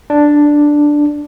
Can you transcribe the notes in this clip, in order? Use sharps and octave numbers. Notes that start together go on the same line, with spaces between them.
D4